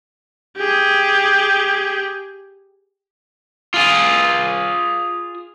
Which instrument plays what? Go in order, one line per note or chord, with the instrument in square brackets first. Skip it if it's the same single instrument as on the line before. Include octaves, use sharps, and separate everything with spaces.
[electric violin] G4 G#4
[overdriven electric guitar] F4 G#4